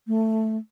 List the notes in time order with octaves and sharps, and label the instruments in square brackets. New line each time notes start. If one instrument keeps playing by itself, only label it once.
[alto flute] A3